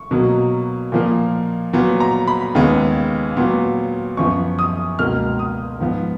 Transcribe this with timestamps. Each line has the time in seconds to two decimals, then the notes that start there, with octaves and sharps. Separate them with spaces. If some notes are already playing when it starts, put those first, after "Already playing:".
Already playing: C#6
0.11 B2 F#3 A#3
0.92 A#2 F3 A#3
1.73 A#2 F#3 B3
2.00 A#5
2.28 B5
2.55 D#2 C#3 G#3 B3
3.36 A#2 F#3 B3
4.17 F#2 F3 B3 C#6
4.59 D#6
4.99 C#2 B2 A#3 F6
5.39 D#6
5.80 G#2 F3 B3